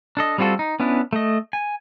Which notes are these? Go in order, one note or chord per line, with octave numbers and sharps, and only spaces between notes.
D4 A4 D#5
G3 C4 F4 F#4 A4
D#4
B3 C#4 D4 E4
A3 D#5
G#5